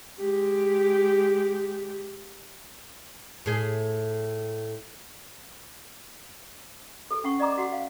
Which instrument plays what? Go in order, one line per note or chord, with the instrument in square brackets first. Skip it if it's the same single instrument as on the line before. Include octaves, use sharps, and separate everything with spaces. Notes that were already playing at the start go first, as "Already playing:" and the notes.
[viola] G#3 G4
[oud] A2 G#4
[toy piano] G#4 A4
C#4 F#5 C#6
D5 D#5 A#5 D6
F#4 F#5
F5